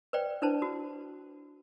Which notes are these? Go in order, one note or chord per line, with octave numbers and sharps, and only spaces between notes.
B4 C5 D5 G5
D4 E4 B4 C5 A5
F#4